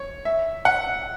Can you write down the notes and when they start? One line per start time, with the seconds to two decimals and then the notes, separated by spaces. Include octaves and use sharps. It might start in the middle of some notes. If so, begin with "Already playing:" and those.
Already playing: C#5
0.25 E5
0.65 F#5